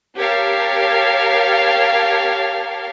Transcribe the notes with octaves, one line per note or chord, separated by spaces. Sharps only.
G4 A#4 C#5 F5 A5